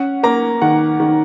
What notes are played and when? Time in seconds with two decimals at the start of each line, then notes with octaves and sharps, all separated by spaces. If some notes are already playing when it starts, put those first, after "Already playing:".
Already playing: C#4 F#5
0.23 A#3 A#5
0.62 D#3 F#5
1.00 D#3